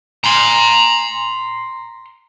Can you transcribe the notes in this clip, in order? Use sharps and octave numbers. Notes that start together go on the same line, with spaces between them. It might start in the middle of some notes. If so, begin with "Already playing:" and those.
A#5 C6